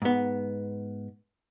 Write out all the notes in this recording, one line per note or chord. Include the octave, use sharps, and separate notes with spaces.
G#2 B3